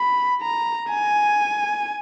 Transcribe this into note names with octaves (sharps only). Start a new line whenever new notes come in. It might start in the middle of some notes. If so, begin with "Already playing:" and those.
Already playing: B5
A#5
G#5